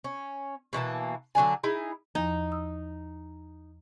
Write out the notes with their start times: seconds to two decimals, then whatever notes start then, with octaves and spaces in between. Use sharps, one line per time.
0.04 C#4
0.73 B2 E3 A#3 A5
1.35 D3 F#3 D4 G#5
1.63 D#4 E4 G#4
2.15 E2 F3 D#4
2.52 D#6 E6